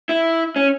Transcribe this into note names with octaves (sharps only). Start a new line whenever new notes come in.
E4
C#4